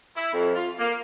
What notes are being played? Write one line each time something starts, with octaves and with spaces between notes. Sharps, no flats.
E4
F2
F4
A#3